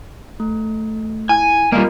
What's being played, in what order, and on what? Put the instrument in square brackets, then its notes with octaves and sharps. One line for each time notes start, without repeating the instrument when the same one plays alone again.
[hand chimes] A3
[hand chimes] E4 [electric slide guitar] G#5
[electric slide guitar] G3 A#3 [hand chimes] F4 A#4 D#5